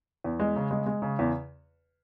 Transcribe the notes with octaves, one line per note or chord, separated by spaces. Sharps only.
E2
G#3
C#3
G#3
G#3
C#3
E2